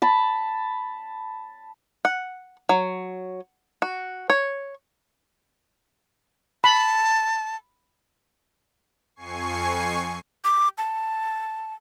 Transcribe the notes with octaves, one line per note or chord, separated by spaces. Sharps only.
A5 B5
F#5
F#3
F#4
C#5
A5 B5
F2 G#5 C#6 C7
D6
A5